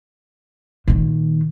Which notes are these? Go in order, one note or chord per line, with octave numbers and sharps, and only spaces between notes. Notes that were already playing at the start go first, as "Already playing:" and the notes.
A#2 D#3